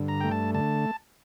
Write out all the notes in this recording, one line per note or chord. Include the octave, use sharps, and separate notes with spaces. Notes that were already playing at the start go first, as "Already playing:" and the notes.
Already playing: G2 D3
A#5
A3 G5
A5
D3 A5